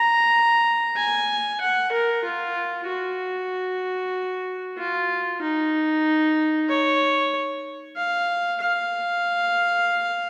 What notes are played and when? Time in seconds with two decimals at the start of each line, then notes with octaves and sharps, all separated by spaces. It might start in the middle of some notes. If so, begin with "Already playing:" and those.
Already playing: A#5
0.96 G#5
1.61 F#5
1.92 A#4
2.24 F4
2.87 F#4
4.78 F4
5.42 D#4
6.69 C#5
7.96 F5
8.61 F5